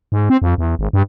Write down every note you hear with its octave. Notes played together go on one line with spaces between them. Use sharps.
G#2
C4
F2
E2
G#1
G2